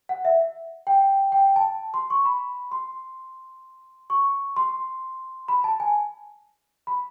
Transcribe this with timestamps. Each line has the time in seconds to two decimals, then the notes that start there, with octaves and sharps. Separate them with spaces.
0.09 F#5
0.25 E5
0.87 G5
1.32 G5
1.56 A5
1.94 C6
2.10 C#6
2.25 B5
2.72 C6
4.10 C#6
4.56 C6
5.48 B5
5.64 A5
5.80 G#5
6.87 B5